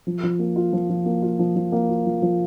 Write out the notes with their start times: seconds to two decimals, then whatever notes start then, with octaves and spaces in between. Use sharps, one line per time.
0.07 F3
0.23 F3
0.39 A#3
0.56 F4
0.73 F3
0.89 F3
1.05 A#3
1.22 F4
1.39 F3
1.56 F3
1.72 A#3
1.89 F4
2.06 F3
2.22 F3